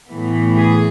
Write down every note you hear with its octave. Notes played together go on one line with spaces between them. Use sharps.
A2 E3 B3
G#4